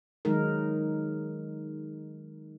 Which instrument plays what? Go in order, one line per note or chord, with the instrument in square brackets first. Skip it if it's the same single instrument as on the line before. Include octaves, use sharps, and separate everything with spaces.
[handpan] D#3 F#3 G#3 D#4 A#4